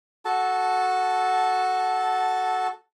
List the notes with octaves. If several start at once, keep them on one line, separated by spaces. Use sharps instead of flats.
F#4 A4 A5